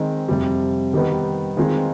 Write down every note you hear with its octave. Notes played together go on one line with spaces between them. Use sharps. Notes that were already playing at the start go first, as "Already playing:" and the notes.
Already playing: D#3 G#3 C4
F2 C3 G3
D#3 G3 B3
D#3 G#3 C4 F4